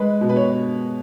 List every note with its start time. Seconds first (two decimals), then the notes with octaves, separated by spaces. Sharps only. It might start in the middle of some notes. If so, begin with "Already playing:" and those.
Already playing: G#3 B4
0.21 B2
0.29 B4
0.36 C#5